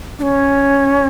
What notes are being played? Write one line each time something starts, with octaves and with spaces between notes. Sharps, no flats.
D4
C#4